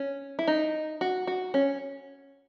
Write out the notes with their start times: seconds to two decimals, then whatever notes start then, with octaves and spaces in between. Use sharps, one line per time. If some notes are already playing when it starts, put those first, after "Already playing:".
Already playing: C#4
0.39 E4
0.48 D#4
1.01 F#4
1.27 F#4
1.54 C#4